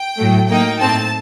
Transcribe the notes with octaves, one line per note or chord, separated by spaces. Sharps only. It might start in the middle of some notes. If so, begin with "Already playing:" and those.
Already playing: G5
A2 F#3 A3
F#3 A#3 D#4 G5
A2 A3 C4 D#4 A5